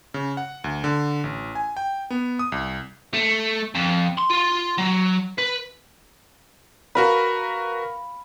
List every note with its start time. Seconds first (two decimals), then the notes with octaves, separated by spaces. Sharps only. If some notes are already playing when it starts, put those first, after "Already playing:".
0.14 C#3
0.37 F#5
0.64 D2
0.84 D3
1.24 A1
1.55 G#5
1.77 G5
2.10 B3
2.39 D#6
2.52 C2
3.13 A3
3.75 F2
4.18 C6
4.30 F4
4.78 F#3
5.39 B4
6.95 F#4 A#4 B4 F5 B5